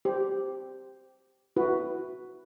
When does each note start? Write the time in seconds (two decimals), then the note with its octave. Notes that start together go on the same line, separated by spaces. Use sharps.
0.05 G4 C5
1.56 E4 F#4 B4